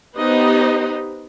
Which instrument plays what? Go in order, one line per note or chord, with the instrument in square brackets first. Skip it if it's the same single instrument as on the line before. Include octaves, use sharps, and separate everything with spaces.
[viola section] B3 D#4 G4 B4 C5 D#5